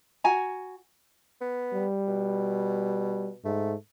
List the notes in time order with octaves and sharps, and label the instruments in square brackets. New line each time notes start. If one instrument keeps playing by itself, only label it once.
[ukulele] F#4 G#5 A#5
[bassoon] B3
[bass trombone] G3
[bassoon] B2
[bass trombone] G#2 [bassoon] A3